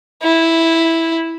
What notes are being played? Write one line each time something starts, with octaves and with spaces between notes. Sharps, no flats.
E4